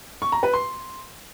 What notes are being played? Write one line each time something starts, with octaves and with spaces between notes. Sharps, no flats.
C#6
A#5
B4
C6